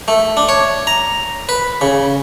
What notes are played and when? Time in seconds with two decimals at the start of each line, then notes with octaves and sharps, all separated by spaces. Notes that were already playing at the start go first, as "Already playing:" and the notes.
0.08 A3
0.37 D4
0.49 C#5
0.87 A#5
1.49 B4
1.81 C#3